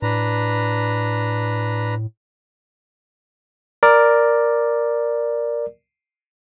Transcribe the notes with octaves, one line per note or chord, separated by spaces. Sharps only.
A2 D4 B4 A#5
A#4 D5